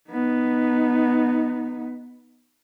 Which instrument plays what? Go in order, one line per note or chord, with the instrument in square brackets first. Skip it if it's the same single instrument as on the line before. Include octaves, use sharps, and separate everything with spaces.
[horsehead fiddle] B3 D#4